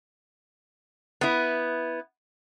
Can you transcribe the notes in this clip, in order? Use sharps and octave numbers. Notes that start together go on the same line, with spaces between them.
B3 E4